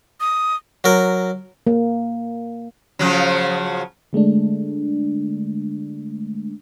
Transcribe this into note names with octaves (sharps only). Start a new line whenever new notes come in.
D#6
F#3 A#4
A#3
C#3 F3 F#3
D3 G#3 A3 D4